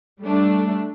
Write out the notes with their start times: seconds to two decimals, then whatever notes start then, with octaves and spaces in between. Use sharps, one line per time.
0.21 G3 A3 D4